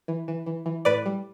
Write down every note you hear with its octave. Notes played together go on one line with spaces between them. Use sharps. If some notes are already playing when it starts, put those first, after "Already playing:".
E3
E3
E3
E3
A2 B4 D5
G3